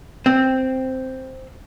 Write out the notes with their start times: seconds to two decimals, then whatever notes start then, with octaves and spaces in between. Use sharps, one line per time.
0.26 C4